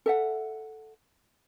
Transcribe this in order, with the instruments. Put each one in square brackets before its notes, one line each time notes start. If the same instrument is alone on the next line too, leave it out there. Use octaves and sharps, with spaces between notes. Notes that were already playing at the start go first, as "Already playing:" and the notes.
[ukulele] A4 E5 F#5